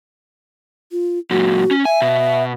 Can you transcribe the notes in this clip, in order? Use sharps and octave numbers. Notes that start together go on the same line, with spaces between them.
F4
F#2 A#2 F#4
C#4
E5 G#5
B2